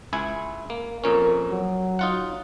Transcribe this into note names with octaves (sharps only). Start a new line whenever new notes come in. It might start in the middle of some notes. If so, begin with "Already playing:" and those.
C#2 E4 G#5
A#3
F2 A#2 C#4 A#4
F#3
D#4 F4 F#5